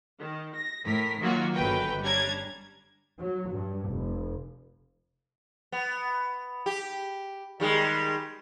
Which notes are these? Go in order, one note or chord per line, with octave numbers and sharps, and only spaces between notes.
D#3
A#6
A2 A#4 B6
D#3 F#3 A#3 F4 F#4
G1 F#3 F#4 A#4 B4 G5
G3 C#4 D4 A#5 G#6 A6
F#3
G2
F1
B3
G4
D#3 G3 G#3